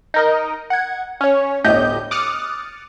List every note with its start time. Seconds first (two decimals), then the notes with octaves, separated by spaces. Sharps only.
0.14 D#4 A#4 D#5
0.70 F#5 G#6
1.21 C#4 C#5
1.64 G1 D2 A2 G4 D#5 G6
2.11 D6 D#6 F6 F#6 A6 C#7